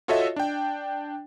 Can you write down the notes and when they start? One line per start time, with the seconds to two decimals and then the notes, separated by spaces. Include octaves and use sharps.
0.08 F4 F#4 A4 C#5 D#5 E5
0.36 D4 G5